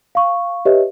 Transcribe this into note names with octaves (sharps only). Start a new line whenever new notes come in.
F5 C#6
G4 B4 C#5 D#5 E5